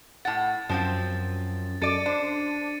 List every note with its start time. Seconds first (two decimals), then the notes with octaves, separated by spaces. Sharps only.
0.25 A2 F#5 A6
0.69 F#2 F3 C4 F4
1.82 F#2 A4 D5 A6 C#7 D#7
2.06 D4 C5